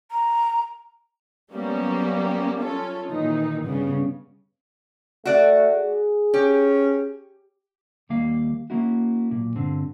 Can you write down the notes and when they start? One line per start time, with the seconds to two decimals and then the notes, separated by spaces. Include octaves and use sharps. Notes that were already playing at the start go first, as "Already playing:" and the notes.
0.11 A#5
1.52 F#3 G3 A#3 B3 C#4 G4
2.58 C#4 F4 A4 C#5
3.08 A#2 D#3 E3 D#4
3.65 G2 C#3 G3 B3
5.25 A3 F#4 D5
5.74 G#4
6.34 C#4 G4
8.09 D#2 D#3 G3 A#3 F5
8.70 A#3 C#4 E4 F#4
9.31 B1 A#2
9.56 G2 D3 C4